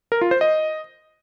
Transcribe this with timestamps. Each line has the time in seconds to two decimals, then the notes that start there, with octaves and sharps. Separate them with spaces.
0.12 A#4
0.21 F4
0.31 C5
0.41 D#5